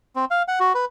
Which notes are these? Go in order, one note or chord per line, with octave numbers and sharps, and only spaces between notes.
C4
F5
F#5
F#4
B4